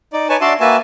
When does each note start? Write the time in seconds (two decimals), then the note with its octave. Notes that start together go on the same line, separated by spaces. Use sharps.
0.13 D#4 D5
0.29 D#4 B4 C#5 G#5 A5
0.41 D4 F#4 D5 E5 A5 C6
0.60 A#3 F#4 B4 E5 G#5 A5